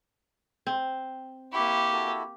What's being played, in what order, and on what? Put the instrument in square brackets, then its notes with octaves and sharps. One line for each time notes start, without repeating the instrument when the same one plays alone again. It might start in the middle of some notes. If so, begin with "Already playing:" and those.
[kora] C4
[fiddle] A#3 G4 [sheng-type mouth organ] E4 B5 C#6
[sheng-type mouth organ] E4 F#4 A4